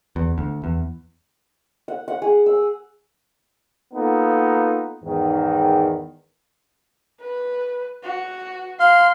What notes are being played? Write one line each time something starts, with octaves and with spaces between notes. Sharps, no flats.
E2
D2
E2
F#5
F#5
G#4
E6
A#3 B3 D#4 F4 A4
E2 G#2 D#3
B4
F#4
F5 C6